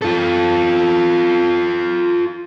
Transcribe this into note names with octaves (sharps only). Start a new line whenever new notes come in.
F4 A4